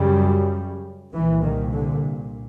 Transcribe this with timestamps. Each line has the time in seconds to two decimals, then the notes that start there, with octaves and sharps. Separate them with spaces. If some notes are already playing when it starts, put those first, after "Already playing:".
Already playing: F#2 C#3 G3
1.14 C2 A#2 E3
1.43 D#3
1.71 D3